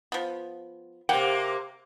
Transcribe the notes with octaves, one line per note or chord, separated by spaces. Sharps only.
F3 B3
C3 A#3 F#5 G5